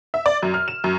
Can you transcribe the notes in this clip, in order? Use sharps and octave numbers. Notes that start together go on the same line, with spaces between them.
E5
D5
F#2
F6
E7
F#2